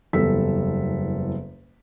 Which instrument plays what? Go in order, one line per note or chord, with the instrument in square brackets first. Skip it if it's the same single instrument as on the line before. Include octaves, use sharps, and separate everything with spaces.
[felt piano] F#1 E2 G3 A4 E6 B6